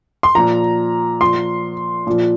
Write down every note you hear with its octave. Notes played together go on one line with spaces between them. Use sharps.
C6
A#2 F3 A#5
A#2 F3 C6
A#2 F3